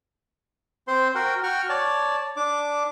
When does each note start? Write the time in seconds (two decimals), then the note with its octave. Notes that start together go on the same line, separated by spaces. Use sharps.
0.88 C4 C5 C6
1.15 F#4 A#4 F#5 G5
1.43 F#4 F#5 G5 C#6 F6
1.69 C#5 D5 A5
2.37 D4 D6